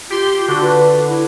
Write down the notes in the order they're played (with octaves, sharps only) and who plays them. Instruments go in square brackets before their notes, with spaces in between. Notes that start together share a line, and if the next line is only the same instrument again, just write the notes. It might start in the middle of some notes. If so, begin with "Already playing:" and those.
[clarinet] F4 [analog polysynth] G4 C6
[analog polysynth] D3 [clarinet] F#4
[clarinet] B4
E4